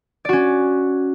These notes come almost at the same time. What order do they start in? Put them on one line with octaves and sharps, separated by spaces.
D5 F#4 C#4